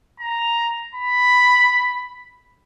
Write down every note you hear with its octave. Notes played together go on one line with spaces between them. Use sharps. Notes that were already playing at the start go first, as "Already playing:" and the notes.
A#5
B5